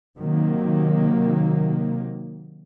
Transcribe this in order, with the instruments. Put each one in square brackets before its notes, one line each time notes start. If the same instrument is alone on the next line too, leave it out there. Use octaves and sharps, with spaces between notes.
[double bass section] C3 D#3 F#3 A#3